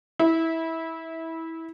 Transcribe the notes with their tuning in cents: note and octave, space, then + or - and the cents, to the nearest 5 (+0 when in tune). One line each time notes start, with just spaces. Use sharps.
E4 -20